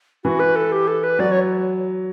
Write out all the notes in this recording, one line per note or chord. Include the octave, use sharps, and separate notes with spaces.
E3 F#4
B4
A4
G4
A4
B4
F#3 D5
C#5